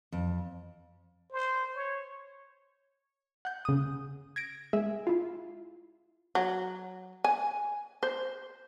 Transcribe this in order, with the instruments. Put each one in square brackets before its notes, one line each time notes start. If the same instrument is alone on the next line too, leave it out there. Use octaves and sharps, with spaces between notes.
[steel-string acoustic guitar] F2
[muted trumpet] C5
C#5
[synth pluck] F#5 G6
C#3 D#6
G#6 A#6 D7
G#3 G#4 E5
E4 F4
[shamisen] F#3
G#5
C5